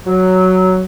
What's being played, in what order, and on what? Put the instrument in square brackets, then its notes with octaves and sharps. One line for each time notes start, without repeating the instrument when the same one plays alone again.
[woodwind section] F#3